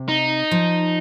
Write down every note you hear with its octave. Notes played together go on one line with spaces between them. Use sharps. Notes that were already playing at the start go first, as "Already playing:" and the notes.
Already playing: C3
D#4
F3